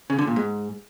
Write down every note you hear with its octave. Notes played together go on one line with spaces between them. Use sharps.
C#3
D3
A#2
G#2